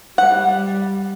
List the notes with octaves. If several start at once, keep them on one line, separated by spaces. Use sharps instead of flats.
G3 F#5